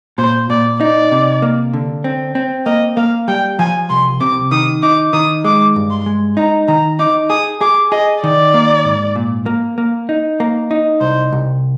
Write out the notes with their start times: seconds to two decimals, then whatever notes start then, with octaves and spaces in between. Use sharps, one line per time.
0.18 A#2 C5
0.50 A#2 D5
0.80 D#4 D5
1.12 C3
1.42 A#3
1.73 D3
2.04 C4
2.35 C4
2.66 A#3 D#5
2.97 A#3 F5
3.28 G3 G5
3.59 F3 G#5
3.90 C2 C6
4.20 C3 D6
4.51 D#3 D#6
4.82 D#4 D6
5.13 D#3 D#6
5.45 G#3 D6
5.76 G2
5.91 C6
6.06 G#3
6.37 D#4 A#5
6.68 D#3 A#5
6.99 D#4 D6
7.30 G#4 D#6
7.61 G#4 D6
7.92 G#4 D#5
8.23 D#3 D5
8.54 A#3
8.85 G#2
9.16 A#2
9.46 A#3
9.78 A#3
10.09 D#4
10.40 A#3
10.71 D#4
11.01 C2 C5
11.33 C2